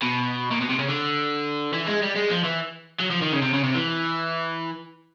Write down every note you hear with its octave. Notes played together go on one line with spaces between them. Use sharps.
B2
A#2
B2
C3
C#3
D3
E3
G#3
G3
G#3
F3
E3
F#3
F3
D#3
C#3
C3
C#3
C3
E3